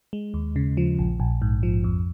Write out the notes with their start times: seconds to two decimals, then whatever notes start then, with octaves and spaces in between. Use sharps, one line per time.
0.13 G#3
0.34 D#2
0.56 C#3
0.77 F3
0.99 A#1
1.20 A#1
1.42 G#2
1.63 F3
1.84 F2